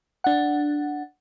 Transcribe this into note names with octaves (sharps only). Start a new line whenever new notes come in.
D4 F#5